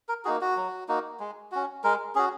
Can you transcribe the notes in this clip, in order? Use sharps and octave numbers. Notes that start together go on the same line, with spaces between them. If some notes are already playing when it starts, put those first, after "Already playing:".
A#4
A#3 D#4 F#4 G#4
F#4
F#3
A#3 D#4 F#4
G#3
C#4 F#4
G#3 A#4
C#4 F#4 G#4